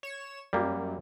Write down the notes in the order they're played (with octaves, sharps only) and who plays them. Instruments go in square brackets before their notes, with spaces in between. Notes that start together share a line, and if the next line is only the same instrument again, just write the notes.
[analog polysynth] C#5 E7
[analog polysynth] F#2 [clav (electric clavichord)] G3 A#3